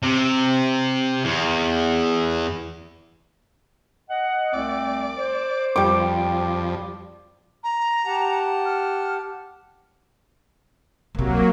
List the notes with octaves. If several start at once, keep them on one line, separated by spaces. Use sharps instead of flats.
C3
E2
D#5 F#5
C2 A3 C4 D5
C5
F2 G3 D6
A#5
G4 F#5 A5
F6
C2 C3 F#3 A#3